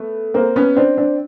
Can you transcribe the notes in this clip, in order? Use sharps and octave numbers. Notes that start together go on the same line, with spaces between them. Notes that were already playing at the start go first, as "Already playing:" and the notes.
Already playing: A3 B3
A#3 C4
B3 C#4
C4 D4
C4 D4